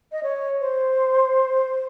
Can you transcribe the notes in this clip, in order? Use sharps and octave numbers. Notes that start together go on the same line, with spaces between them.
D#5
C#5
C5